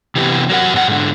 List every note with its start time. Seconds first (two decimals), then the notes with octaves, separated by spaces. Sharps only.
0.15 C3 E3 B3 G4
0.49 F#3 A#4 F#5
0.73 F#2 A#2 G4 F#5
0.88 G#2 D3